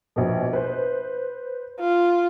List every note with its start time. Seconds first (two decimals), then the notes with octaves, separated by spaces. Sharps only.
0.16 A#1 B2
0.53 B4 C5
1.80 F4